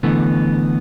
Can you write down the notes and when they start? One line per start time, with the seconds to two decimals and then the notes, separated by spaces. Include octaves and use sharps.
0.03 D3 E3 A3 B3